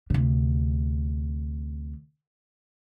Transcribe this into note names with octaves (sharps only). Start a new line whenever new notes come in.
D2 C3